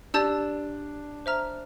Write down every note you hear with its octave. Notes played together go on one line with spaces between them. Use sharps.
D4 G4 D5 A5 E6 G6
C5 E5 A#5 F6